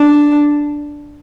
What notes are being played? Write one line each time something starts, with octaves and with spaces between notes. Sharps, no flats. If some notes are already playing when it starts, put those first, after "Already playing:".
Already playing: D4